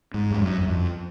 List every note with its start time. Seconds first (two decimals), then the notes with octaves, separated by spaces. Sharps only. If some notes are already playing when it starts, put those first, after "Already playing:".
0.14 G#2
0.31 G2
0.41 F#2
0.61 F#2
0.68 F2